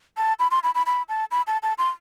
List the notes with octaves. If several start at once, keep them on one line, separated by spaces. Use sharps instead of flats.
A5
B5
C6
B5
B5
B5
A5
B5
A5
A5
C6